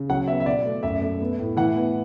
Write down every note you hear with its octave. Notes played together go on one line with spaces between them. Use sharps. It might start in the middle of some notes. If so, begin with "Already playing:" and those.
Already playing: C#3
F#3 F#5
B3 E5
E5
B2 D5
A3
F#2 E5
A3
B3
A2
E3 F#5
B3